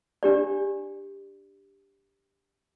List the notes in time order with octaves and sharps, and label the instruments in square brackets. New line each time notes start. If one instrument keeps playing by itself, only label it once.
[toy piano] D4 G4 D5